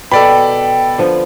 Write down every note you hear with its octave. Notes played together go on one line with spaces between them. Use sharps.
B2 A4 D5 G5 B5
D3 F3 B3